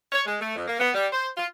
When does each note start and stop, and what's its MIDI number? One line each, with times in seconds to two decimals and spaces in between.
0.12 0.21 73
0.26 0.36 56
0.41 0.56 57
0.56 0.64 41
0.68 0.78 58
0.80 0.90 59
0.95 1.07 55
1.13 1.28 72
1.37 1.46 65